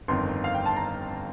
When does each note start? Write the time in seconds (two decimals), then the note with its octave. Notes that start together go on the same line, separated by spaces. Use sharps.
0.08 G1 F2 D#3 C6
0.44 F5
0.55 G5
0.66 A5
0.77 A#5